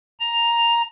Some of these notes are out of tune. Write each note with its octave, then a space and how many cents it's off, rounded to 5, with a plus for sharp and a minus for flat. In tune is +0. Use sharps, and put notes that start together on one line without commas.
A#5 +5